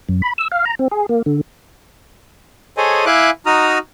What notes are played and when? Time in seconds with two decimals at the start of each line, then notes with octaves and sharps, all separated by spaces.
0.09 F#2
0.22 B5
0.38 E6
0.52 F5
0.66 A#5
0.79 C4
0.91 G#4
1.09 A#3
1.26 D3
2.77 G#4 A4 C5 C#5 D#5 G#5
3.06 E4 E5 F5 G#5 D6 F#6
3.46 D#4 F#4 A#5 D#6 F6